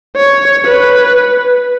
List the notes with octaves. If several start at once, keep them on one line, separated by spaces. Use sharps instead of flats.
C#5
B4